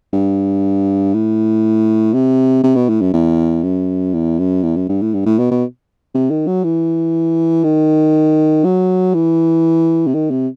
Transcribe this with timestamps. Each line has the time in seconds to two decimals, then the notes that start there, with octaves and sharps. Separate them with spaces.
0.13 G2
1.14 A2
2.13 C3
2.64 C3
2.76 B2
2.89 A2
3.01 F#2
3.14 E2
3.63 F#2
4.14 E2
4.39 F#2
4.64 E2
4.76 F#2
4.89 G2
5.01 A2
5.14 G2
5.26 A2
5.39 B2
5.51 B2
6.14 C3
6.31 D#3
6.47 F#3
6.64 E3
7.64 D#3
8.64 F#3
9.14 E3
10.07 C3
10.15 D#3
10.31 C3